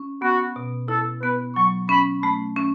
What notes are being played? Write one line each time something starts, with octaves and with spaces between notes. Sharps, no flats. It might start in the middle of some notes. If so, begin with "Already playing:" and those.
Already playing: C#4
B3 F#4
B2
E4 A4
B3 B4
F#3 C#6
C#4 B5
A3 B5
C#4